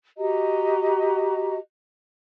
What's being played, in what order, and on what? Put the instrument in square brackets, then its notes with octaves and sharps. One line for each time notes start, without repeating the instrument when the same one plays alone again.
[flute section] F#4 G4 D#5 A#5